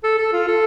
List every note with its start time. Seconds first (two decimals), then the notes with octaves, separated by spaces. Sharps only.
0.04 A4
0.18 A4
0.33 F4
0.47 A4